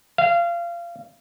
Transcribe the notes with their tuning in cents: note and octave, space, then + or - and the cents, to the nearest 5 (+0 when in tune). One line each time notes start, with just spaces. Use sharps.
F5 -25